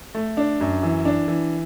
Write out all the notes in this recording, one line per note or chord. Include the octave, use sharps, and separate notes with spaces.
A3
D4
F#2
E3
D4
E3